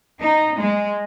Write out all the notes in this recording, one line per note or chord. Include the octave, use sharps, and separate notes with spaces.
D#4
G#3